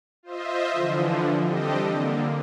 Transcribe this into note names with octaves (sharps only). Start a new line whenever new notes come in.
F4 C5 D#5 E5
D3 E3 F3
G3 C4 D4 G4 A4 D#5
D3 A#3